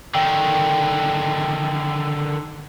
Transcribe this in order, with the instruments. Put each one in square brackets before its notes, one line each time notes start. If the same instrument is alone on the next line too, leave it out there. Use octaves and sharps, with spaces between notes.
[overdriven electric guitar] D3 D#3 [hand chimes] G5